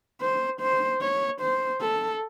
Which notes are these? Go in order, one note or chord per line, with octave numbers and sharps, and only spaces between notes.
C5
C5
C#5
C5
A4